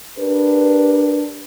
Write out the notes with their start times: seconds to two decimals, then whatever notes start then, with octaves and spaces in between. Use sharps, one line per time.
0.18 D4 G4 A#4 B4